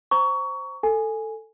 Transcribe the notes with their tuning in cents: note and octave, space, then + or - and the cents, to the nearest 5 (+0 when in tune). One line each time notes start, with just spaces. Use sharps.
C5 +0 A#5 +0 C#6 +20
A4 +10 G#5 +0